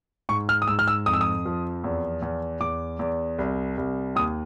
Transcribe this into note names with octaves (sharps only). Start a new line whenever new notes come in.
G#2 C#6
F6
D#6
G#2 E6
F6
E6
F2 D#6
E6
D#6
F3
E2
E2
E2 D6
E2
C2
C2
D#2 D#6